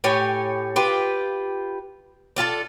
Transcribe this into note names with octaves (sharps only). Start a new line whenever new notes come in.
A2 G4 C#5 G#5
F4 G4 B4
D4 F4 G4 A4